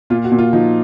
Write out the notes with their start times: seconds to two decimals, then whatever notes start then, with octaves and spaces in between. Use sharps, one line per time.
0.10 A#2 F4
0.24 F#4
0.32 A#2
0.39 F4
0.53 F3 D#4